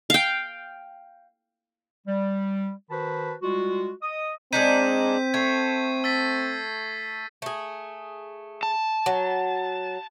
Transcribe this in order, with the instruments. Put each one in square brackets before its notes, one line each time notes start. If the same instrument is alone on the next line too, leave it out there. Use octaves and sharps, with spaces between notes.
[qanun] F5 G5
[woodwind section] G3
D#3 F#4 B4 C5 A5 B5
G3 G#3 F4 F#4
D#5 D#6
[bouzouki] G#3 D4 D#4 [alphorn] C4 [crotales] G6 B6 D#7
[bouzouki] A3 [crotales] G#6 C7
[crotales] E6 A6 B6
[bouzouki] A3 G#4
[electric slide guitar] A5
[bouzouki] F#3